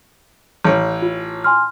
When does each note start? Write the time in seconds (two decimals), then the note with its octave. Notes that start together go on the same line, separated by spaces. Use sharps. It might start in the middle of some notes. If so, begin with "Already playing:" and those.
0.64 A1 C#5 G6
1.02 F4
1.44 G#5 C6 F6